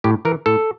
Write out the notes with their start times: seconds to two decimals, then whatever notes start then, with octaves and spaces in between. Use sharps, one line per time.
0.04 A2 G4
0.25 E3 A#4
0.46 A2 A4